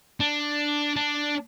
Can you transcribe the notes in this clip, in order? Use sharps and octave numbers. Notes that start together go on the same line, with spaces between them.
D4
D4